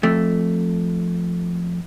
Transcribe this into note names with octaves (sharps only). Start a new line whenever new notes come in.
F2 A3